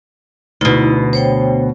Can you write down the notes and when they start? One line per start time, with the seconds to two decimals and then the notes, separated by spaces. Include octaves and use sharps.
0.61 D2 B2 D#4 E4
1.13 C5 C#5 G5